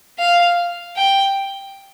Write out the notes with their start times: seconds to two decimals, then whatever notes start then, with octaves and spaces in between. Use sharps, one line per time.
0.19 F5
0.97 G5